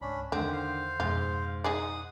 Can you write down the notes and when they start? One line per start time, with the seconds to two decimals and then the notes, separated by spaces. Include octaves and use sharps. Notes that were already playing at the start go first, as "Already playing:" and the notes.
0.01 C#2 G#2 C#4 D4 B5
0.32 E2 D3 D#3 C4 C5 F#5
0.53 C5 F5
1.00 F2 G#2 B2 F4 C6
1.64 D#4 G#4 D5 F#5 D#6